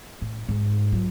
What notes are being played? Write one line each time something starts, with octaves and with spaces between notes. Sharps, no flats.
A2
G#2
F#3 F4